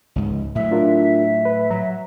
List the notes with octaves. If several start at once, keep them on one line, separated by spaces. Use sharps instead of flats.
C#2 G#2
A2 F#3 E5
D4 F4 A#4
B4
F#3 A#5